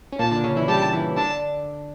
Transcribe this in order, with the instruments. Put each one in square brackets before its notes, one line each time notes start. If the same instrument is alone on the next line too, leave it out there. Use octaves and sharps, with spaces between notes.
[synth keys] C#4
[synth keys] A#2 A#3 [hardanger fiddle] A5
[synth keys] D3 D4
C#3 C#4
E3 E4
[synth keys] G3 G4 [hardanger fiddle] A5
[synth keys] E3 E4
[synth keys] D3 D4 [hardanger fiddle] A5